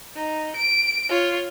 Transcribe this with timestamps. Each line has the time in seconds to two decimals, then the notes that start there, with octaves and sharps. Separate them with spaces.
0.15 D#4
0.56 D7
1.09 F4 C#5